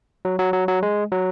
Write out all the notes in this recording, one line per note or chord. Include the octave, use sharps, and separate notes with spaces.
F#3
F#3
F#3
F#3
G#3
F#3